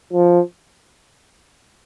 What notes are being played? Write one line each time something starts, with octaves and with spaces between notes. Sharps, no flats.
F3